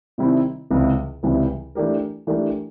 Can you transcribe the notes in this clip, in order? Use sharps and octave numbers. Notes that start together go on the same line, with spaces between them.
C3 D#3 G3 C4 E4
C#2 C3 E3 G3
C#2 C3 E3 G3
E3 A3 D4 G4 A#4
E3 A3 D4 G4 A#4